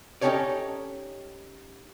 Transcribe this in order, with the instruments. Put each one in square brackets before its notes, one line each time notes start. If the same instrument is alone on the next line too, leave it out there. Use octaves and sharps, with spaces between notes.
[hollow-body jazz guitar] C#4 D#4 G4 A4 C#5 D5